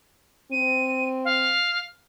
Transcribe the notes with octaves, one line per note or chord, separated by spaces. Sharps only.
C4 D#7
F5